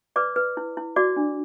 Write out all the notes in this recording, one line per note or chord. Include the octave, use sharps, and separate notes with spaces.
B4 D5 D6
B4
E4
E4
F#4 D5 D6
D4